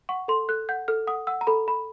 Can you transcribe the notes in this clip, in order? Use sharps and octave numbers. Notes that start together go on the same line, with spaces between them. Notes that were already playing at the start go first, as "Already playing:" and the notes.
F#5 C#6
A4 C6
A4 F#6
F#5 G6
A4 F6
F#5 D#6
F#5 E6
A#5
A4 B5
A4 B5